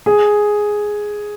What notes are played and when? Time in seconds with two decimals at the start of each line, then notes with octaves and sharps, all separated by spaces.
0.06 G#4